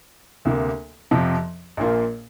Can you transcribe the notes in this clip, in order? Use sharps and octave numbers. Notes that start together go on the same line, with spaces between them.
D2 C3 A#3
F2 C3 F3
A#1 A#2 A#3 F4